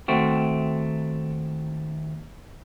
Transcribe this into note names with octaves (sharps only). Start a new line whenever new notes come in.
D#2 A3 C4 F#4